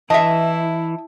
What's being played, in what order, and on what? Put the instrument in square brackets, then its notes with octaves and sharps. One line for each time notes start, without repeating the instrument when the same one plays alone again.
[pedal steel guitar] E3 [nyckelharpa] E4 [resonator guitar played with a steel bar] D#5 E5 [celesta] A5